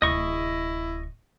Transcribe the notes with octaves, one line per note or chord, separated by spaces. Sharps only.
D1 C3 E4 D#5 C#6